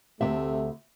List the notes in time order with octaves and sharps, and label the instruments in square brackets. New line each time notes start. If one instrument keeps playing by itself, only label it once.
[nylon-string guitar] D2 D#3 E5 [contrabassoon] C3 [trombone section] A3